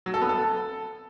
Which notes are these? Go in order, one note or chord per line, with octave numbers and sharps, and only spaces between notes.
F#3
A4
B3
A4